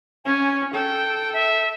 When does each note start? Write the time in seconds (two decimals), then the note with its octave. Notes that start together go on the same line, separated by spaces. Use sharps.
0.25 C#4 G#5
0.74 A4 G5
1.33 E5